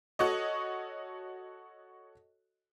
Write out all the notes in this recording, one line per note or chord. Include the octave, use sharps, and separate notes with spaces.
F#4 A4 C#5 D#5